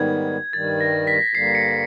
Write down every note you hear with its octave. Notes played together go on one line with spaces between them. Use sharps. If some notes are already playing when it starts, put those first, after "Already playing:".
Already playing: G#2 D#3 G3 B3 G#6
G2 D#3 G3 A6
A#6
B6
G2 D3 G3 A#3 C7
C#7